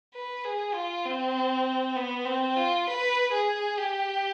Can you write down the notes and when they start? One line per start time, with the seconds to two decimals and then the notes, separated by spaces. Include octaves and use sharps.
0.15 B4
0.45 G#4
0.75 F4
1.06 C4
1.96 B3
2.26 C4
2.57 F4
2.87 B4
3.33 G#4
3.78 G4